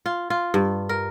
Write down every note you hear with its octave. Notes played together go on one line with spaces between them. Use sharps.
F4
F4
G2
A#4